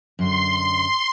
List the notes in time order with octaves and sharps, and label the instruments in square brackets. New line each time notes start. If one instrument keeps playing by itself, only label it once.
[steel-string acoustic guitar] F#2 D3 [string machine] C6